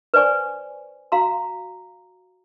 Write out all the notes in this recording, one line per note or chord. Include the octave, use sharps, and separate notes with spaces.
B4 C5 D5 G#5 C#6
F#4 F5 A#5 C6